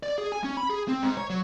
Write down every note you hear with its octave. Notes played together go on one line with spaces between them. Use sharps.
D5
G#4
G#5
C#4
B5
G#4
C4
G#2
C#5
F#3